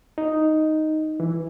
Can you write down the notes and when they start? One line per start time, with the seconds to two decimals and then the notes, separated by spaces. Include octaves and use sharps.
0.18 D#4
1.20 E3